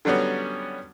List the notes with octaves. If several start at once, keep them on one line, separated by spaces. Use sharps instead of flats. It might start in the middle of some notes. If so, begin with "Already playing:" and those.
D3 F#3 G3 B3 C#4